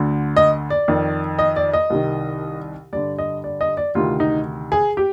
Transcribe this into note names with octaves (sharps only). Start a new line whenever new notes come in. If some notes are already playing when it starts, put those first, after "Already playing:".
Already playing: D2 D3
D#5
D5
F2 D#3
D#5
D5
D#5
C2 C3 D#3
G2 D3 D5
D#5
D5
D#5
D5
D2 C3 D#3 F4
D#4
G#4
G4